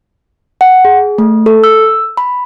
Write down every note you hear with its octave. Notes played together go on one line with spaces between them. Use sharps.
F#5
G#4
A3
A4
E6
B5